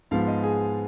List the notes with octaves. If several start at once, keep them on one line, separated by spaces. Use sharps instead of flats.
G#2 F3 G#3 B3 F5
D#5
G#4